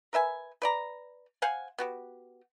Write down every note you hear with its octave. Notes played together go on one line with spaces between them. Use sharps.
A#4 B4 E5 G#5
B4 D5 A#5
C5 F5 F#5 G#5
B3 F#4 G4